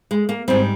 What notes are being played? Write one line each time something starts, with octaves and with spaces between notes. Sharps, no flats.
G#3
A#3
G#2 G3 C4